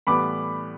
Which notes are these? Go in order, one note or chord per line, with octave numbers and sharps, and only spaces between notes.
A2 E3 G3 B3 B5 D6